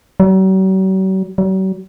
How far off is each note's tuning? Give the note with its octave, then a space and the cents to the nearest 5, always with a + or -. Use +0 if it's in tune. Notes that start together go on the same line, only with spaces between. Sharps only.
F#3 +45
F#3 +45